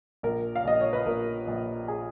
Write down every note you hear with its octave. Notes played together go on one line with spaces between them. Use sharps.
A#1 A#4
F5
A#1 D#5
C#5
B4
A#1 A#4
A#1
G#4